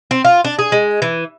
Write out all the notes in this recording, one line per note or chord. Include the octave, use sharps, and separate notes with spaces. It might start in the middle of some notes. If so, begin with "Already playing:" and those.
C4
F4
D4
G#4
G#3
E3